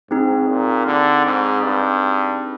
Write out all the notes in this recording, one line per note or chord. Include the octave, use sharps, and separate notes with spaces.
G#2 C4 D#4 G#4
A#2
D3
G#2
G2